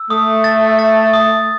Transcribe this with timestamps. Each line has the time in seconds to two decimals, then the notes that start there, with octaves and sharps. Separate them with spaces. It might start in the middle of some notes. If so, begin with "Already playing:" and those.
Already playing: E6
0.10 A3 D#6
0.44 A6
0.79 A6
1.13 D#6